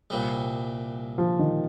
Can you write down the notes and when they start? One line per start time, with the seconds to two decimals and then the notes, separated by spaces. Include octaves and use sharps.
0.10 C2 A#2 G3
1.18 F3
1.39 D#3